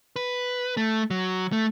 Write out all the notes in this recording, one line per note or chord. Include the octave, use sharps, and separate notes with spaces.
B4
A3
F#3
A3